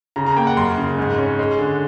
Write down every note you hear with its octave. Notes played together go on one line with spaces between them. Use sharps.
C#3 A#5
A#5
A#3 G5
F#5
F#2 C6
C#3
G#2
C#4
G#3
D3